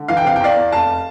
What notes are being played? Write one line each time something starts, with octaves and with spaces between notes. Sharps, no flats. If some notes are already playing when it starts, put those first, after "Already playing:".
Already playing: D3
E3 F5
G5
C3 F5
G5
E2 D5 F5
E2
F1 F5 A5